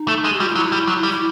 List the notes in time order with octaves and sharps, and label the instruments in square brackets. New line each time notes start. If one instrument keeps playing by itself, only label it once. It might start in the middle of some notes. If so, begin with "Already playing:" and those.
Already playing: [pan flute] D#4
[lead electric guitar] A3
G#3
[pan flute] G4
[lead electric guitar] G3 [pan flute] F#4
[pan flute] F4
[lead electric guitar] F#3 [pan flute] E4
[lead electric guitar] G3
F#3
G3
[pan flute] E4